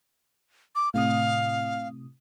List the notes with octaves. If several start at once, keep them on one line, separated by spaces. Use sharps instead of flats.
D6
A2 C3 F5 D#6